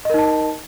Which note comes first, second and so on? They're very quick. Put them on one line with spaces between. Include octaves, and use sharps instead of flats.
D#5 A#4 D#4 A5